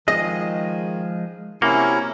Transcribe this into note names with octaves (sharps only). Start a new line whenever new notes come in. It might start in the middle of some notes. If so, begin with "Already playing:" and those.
D#3 F3 G#3 G#4 D#5
C3 A#3 C#4 E4 F#4 C#5